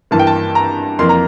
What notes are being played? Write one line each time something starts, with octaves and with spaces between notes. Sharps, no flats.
G2 E3 A#3 A5
G5
A5
A#5
F2 E3 A#3 C6
A#5